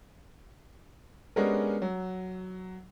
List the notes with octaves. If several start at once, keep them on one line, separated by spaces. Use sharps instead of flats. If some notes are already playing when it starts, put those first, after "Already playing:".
G#3 B3 C#4 D4 G4 A#4
F#3